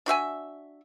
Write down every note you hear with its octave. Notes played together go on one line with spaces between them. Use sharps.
D4 F#4 E5 G#5